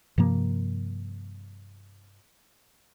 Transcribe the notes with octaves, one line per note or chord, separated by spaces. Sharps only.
G2 C3 F3 A#3